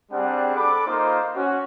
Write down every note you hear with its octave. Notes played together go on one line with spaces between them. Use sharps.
G3 C4 D4 G#4 F#5
A4 B5 D6
A#3 D#4 F4 C5 D#5
C#4 F#4